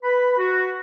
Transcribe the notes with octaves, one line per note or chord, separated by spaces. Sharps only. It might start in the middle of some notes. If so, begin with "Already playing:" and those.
B4 B5
F#4